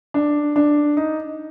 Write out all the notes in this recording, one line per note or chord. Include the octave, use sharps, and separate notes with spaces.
D4
D4
D#4